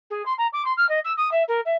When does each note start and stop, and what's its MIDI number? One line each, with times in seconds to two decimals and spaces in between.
0.10 0.25 68
0.26 0.33 84
0.38 0.47 82
0.53 0.63 86
0.65 0.73 84
0.77 0.88 89
0.89 0.99 75
1.05 1.13 88
1.17 1.31 87
1.32 1.43 76
1.48 1.61 70
1.65 1.76 76